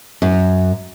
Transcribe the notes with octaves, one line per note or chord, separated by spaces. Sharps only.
F#2